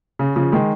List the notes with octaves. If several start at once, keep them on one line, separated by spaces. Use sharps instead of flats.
C#3
C#3 F3
D#3 G#3